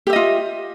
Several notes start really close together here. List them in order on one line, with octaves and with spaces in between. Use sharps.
G4 E5 D#5 F4